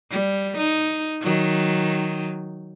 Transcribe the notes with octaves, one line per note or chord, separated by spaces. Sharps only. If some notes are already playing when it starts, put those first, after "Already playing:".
G3
D#4
D#3 F#3